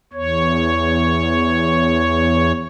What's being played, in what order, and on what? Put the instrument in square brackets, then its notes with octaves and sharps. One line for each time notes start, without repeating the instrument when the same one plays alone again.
[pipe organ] E2 C#5